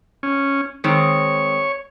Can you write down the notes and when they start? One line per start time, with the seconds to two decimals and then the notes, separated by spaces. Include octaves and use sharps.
0.23 C#4
0.84 D#3 G#3 C4 C#5